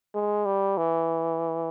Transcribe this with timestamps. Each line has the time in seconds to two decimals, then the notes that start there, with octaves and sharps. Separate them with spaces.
0.14 G#3
0.45 G3
0.77 E3